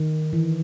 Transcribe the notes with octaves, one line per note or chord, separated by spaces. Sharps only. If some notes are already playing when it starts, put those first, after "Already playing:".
Already playing: D#3
E3